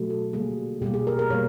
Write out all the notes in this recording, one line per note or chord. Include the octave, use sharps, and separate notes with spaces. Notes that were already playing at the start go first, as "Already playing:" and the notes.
Already playing: B2 F#3 A3
A4
D3 G3 A#3 G#4
B2 G3 A#3 G4
G#4
A#4
A#4
B2 G3 A#3 C#5